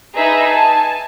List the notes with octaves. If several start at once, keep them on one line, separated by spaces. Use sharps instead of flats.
D#4 G#4 B4 E5 A#5
G#5 A5